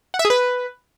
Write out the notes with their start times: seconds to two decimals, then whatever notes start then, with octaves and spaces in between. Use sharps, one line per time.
0.14 F#5
0.19 E5
0.25 G#4
0.30 B4